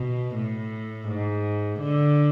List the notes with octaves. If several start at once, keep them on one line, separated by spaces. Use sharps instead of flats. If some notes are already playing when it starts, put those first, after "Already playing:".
Already playing: B2
A2
G#2
D3